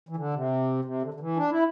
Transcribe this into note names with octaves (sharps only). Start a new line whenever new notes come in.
E3
D3
C3
C3
D3
D3
E3
D4
E4